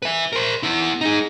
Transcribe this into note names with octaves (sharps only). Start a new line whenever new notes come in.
B4 E5
A#4 C5
B3 E4
D#4 G#4